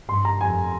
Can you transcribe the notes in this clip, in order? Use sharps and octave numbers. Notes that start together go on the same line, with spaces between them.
G2 C6
A#5
F2 G#5